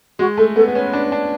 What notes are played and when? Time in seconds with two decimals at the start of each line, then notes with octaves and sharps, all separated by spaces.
0.19 G#3 F#4
0.38 A3 A4
0.56 B3 A4
0.67 B3
0.75 C#4 B4
0.93 D4
1.12 D4